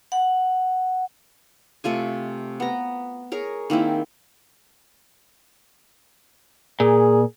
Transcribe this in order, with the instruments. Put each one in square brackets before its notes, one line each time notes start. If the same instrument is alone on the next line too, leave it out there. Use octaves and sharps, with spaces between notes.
[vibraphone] F#5
[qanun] C3 A3 F4 G#5
B3 A#5
G#4 A#4 C#5
D#3 A#3 C4 E4
[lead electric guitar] A#2 [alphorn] G#4